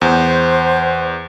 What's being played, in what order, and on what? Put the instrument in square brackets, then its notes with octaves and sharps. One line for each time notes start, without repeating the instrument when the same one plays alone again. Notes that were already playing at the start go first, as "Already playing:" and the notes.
[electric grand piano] E2 [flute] C5